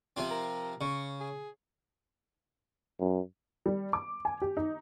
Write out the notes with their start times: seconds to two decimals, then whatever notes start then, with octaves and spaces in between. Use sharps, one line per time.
0.17 C3 F3 C4
0.31 A#4
0.81 C#3 C#6
1.20 G#4
3.00 F#2
3.66 G3
3.93 D6
4.25 G#5
4.42 G4
4.57 D#4